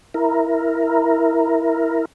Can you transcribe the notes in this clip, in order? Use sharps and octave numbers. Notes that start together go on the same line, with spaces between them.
E4 A#4